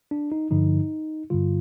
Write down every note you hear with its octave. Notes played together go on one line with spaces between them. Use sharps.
D4
D#4
G2 D3 F3 D#4
G2 D3 G3 F4